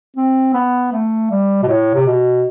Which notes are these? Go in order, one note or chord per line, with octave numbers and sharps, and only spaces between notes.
C4
B3
A3
G3
B2
A2
C3
B2